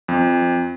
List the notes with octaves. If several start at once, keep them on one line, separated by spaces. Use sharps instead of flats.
F2